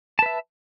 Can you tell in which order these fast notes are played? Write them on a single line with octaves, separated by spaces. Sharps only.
A5 B4 E5